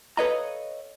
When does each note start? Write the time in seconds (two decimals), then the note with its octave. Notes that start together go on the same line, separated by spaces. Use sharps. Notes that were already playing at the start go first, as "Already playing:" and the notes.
0.17 A4 B4 C#5 D#5 F5 A#5